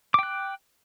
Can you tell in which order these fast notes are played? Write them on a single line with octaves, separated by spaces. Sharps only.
D6 G5 F#6